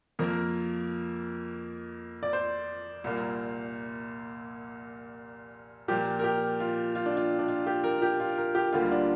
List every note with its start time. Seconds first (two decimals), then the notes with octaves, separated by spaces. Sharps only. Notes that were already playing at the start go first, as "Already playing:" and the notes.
0.19 F2 F3 A#3 A#4
2.23 D5
2.33 C5
3.04 C2 A#2 A#3
5.88 A#2 F3 A#3 G4
6.19 A#4
6.24 G4
6.60 F4
6.95 F4
7.06 D4
7.17 F4
7.39 D4
7.48 F4
7.67 G4
7.84 A#4
8.02 G4
8.20 F4
8.38 A#4
8.55 G4
8.73 D2 D3 G3 A#3 F4
8.92 D4